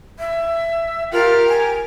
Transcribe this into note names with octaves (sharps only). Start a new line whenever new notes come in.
E5
F4 G4 A#4
G#5